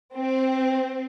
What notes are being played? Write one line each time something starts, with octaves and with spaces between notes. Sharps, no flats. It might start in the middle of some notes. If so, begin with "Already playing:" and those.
C4